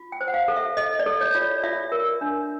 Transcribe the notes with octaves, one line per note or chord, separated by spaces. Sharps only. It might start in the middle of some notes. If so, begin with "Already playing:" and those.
Already playing: F4
G5
C5
F#5
F5
A4
E5
A4 D#5
D5
A4
C#5
F4
D5
F4 E5
A#4
D4